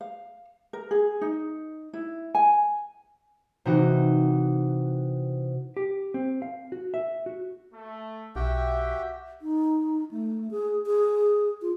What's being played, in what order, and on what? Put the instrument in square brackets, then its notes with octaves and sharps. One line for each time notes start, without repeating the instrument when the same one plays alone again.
[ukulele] F5
A#4
G#4
D#4
E4
G#5
[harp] C3 E3 D#4 F#4
[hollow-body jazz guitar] G4
C4
F5
F#4
E5
F#4
[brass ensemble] A3
[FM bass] B1 [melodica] F#4 G4 G5 [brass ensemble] E5
[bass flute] D#4
A3
G#4
G#4
F4